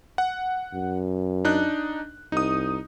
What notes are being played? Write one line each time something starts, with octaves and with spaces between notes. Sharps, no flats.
F#5
F#2
D4 D#4 F#6
C2 D#4 D#6